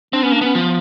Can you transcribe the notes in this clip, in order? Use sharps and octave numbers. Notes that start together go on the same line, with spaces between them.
C4 D4
B3 C#4
A#3 D4
B3 C#4
F3 B3